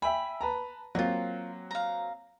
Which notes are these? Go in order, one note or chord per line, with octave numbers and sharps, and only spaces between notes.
E5 G5 G#5 B5
B4 A5 A#5
F#3 A#3 C4 F4 F#4
F5 A#5